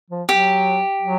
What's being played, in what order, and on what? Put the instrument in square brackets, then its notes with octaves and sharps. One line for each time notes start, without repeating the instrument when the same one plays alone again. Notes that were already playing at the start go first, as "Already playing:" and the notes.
[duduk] F3
[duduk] F#3 [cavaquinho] G4
[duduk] F#3